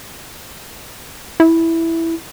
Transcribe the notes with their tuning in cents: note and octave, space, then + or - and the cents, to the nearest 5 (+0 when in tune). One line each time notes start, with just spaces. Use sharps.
E4 +0